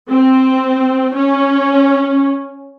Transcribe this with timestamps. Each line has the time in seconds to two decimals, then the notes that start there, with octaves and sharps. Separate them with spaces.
0.11 C4
1.15 C#4